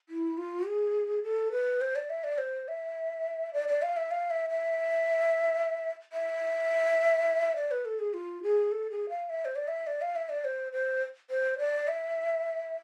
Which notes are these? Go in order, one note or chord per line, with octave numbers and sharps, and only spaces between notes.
E4
F4
G#4
A4
B4
C5
D5
E5
D5
C5
E5
D5
D5
F5
E5
F5
E5
E5
E5
D5
B4
A4
G#4
F4
G#4
A4
G#4
F5
E5
C5
D5
E5
D5
F5
E5
D5
C5
C5
C5
D5
E5